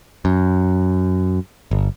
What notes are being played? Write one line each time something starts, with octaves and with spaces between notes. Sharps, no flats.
F#2
G1